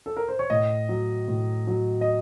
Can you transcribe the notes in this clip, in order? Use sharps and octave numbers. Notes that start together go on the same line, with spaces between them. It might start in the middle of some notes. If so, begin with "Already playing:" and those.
A4
A#4
C5
C#5
A2 D#5
F#3
A2
F#3
D#5